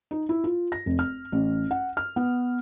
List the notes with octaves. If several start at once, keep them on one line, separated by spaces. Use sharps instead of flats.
D#4
E4
F4
A#6
F1
F6
A1
F#5
F6
B3